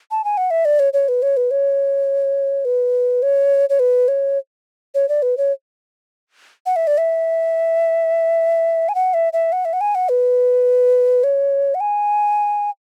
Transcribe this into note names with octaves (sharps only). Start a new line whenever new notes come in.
A5
G#5
F#5
E5
D5
C#5
C#5
B4
C#5
B4
C#5
B4
C#5
C#5
B4
C#5
C#5
D5
B4
C#5
F#5
E5
D5
E5
G#5
F#5
E5
E5
F#5
E5
F#5
G#5
F#5
B4
C#5
F#5
G#5